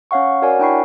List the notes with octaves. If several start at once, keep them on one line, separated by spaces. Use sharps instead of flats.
C#4 C#5 F5 F#5 C#6
F#4 A#4 C#5 D5 F#5 G#5
D4 E4 G5 B5 C#6 C7